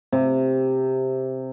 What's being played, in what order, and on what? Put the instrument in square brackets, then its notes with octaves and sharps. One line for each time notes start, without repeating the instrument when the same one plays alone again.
[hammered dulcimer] C3